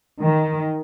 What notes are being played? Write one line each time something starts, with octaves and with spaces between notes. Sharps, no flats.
D#3